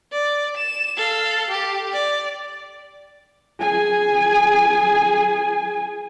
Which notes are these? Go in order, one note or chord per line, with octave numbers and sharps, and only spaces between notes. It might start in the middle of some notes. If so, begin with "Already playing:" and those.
D5
E7
A4 F5
G4
D5
G#4 G#5